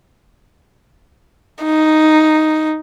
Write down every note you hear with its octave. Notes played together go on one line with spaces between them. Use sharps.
D#4